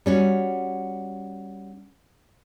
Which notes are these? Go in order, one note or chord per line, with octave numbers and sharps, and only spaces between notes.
G3 C#4 F#4